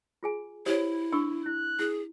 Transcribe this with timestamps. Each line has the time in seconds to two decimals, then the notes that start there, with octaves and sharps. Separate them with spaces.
0.23 F4 G#4 G#5
0.66 E4 G4 C5 C#5
1.13 D4 C#6 E6
1.46 E4 F#6
1.79 E4 G#4